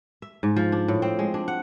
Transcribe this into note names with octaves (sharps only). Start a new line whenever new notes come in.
E5
G#2
F3
D4
A2
C4
G#3
D4
F#5